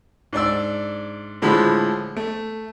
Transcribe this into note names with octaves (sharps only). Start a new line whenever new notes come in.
G#2 D4 D5 E6
A2 D3 F3 G#3 B5
A3